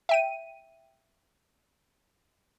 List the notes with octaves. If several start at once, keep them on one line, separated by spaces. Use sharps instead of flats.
E5 G5 D#7